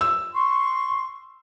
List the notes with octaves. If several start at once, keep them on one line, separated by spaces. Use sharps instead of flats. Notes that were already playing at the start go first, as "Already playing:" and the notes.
E6
C6 C#6